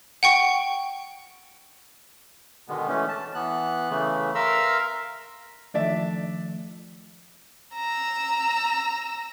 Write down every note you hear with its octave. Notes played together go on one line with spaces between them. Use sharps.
F#5 G5 C#6
B2 D3 D#3 G#3 B3
E3 A3 C#4
A5
E3 B3 F#6
C#3 E3 A3
A#4 E5 F5 A#5 C6 E6
D#3 F3 A3 D4 D5 E5
A#5 E6